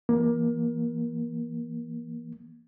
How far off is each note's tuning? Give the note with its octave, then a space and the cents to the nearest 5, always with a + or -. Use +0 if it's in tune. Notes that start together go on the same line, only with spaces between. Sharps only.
E3 +20 A#3 +25